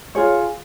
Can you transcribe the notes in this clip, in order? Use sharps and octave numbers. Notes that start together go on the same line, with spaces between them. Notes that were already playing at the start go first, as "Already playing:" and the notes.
F4 G#4 C#5